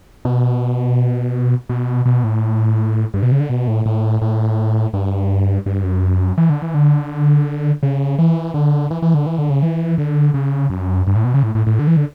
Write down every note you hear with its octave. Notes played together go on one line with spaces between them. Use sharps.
B2
B2
B2
A2
G2
B2
C#3
D3
B2
A2
A2
A2
G2
G2
F#2
E3
D3
E3
D3
C#3
E3
D3
E3
E3
D3
E3
D3
C#3
E3
D3
C#3
F#2
G2
A2
B2
C#3
A2
A2
A2
D3
E3
D3